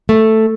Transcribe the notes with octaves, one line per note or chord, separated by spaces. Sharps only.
A3